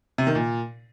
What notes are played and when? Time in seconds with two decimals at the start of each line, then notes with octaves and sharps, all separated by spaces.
0.18 C3
0.27 D#3
0.35 A#2